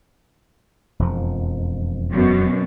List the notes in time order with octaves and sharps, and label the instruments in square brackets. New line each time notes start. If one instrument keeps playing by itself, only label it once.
[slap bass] E1 F2 F3
[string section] F#2 B2